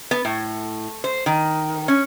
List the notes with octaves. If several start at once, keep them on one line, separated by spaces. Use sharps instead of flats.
B3
A2
C5
D#3
C#4